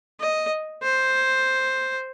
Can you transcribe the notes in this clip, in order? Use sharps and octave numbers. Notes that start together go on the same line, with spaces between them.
D#5
C5